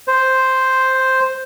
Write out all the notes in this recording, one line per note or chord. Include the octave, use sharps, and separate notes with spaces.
C5